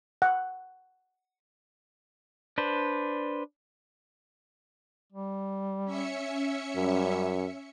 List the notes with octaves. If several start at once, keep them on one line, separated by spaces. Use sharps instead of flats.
F#5
D4 B4 C5 D5
G3
C#4 E5 C#7
F#2 G3